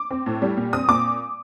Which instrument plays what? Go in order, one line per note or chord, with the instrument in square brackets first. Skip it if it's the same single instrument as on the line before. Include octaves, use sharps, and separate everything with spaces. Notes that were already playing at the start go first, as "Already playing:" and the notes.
Already playing: [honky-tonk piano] D6
C4
A2
G3
A#2
C4 D#6
A#2 D6